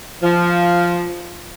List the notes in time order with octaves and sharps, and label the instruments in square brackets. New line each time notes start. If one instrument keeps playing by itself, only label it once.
[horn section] F3